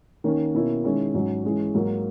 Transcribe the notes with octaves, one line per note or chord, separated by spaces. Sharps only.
D#3 A#3 C#4
B2 A#3 C#4 E4
D#3 G#3 C#4 E4
G#2 F#3 C#4
E3 G#3 C#4
G#2 F#3 A#3 D#4